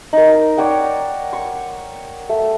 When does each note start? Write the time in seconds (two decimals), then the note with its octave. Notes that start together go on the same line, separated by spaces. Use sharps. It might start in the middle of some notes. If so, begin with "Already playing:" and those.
0.13 D#4 A#4
0.57 C#5 D5 F#5 G5
1.33 C#6
2.29 A3